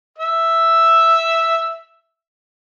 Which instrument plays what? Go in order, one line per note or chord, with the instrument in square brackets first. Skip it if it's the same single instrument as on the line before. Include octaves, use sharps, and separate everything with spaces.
[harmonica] E5 E6